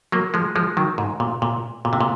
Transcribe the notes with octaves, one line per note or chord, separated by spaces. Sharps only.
F#3 A#3
F3 G#3
F3 G#3
D#3 F#3
G#2
A#2
A#2
A#2
C3
A#2